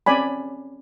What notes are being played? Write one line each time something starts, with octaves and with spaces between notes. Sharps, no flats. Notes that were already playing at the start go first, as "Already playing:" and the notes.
C4 C#4 D5 G#5 B5